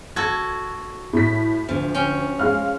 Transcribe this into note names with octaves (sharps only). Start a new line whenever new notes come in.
F#4 A4 G#6
A2 B6
D2 F3
C#4 G5
G#3 F5 F6